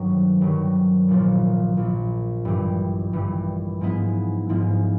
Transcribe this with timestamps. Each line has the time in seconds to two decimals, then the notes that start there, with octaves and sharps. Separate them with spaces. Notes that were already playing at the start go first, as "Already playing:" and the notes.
Already playing: G2 D#3 F#3
0.41 G2 D#3 F#3
1.08 A#1 A#2 F3
1.77 A#1 A#2 F3
2.45 G2 E3 G3
3.13 G2 E3 G3
3.81 G#2 F3 G#3 B3 E4
4.49 G#2 F3 G#3 B3 E4